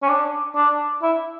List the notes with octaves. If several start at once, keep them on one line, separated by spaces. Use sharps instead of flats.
C#4
D4
D4
E4